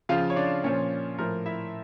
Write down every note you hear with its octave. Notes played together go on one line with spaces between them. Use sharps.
C#3 F3 F4 F5
C#5
D4 D5
A#2 F3 C#4 C#5
A2 F3 A#4
E4 E5